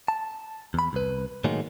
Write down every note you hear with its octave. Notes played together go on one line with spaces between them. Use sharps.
A5
E2 B5
C2 B4
A2 D#3 F#3 G#3 A#3